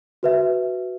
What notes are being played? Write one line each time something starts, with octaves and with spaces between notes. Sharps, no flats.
F#4 B4 E5